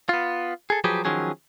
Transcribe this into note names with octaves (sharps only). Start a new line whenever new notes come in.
B3 F4
G#4 A4
F3 F#3 G4 G#4 B4
D#3 F3 F#3 C#4 G#4